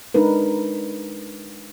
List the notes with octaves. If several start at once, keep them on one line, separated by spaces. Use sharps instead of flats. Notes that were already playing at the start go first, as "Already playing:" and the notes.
G#3 D4 D#4 A#4 B4